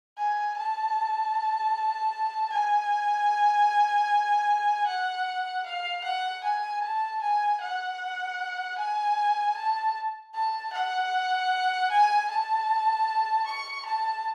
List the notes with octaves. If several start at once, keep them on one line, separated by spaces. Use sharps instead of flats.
G#5
A5
G#5
F#5
F5
F#5
G#5
A5
G#5
F#5
G#5
A5
A5
F#5
G#5
A5
C#6
A5